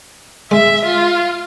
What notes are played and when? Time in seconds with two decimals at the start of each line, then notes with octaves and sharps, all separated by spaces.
0.51 G#3 E5
0.85 F4